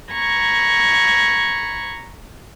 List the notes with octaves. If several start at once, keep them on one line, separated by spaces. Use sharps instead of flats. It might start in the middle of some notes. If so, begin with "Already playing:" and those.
A#5 B5 C#6 G#6